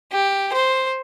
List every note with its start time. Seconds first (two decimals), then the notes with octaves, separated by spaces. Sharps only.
0.12 G4
0.53 C5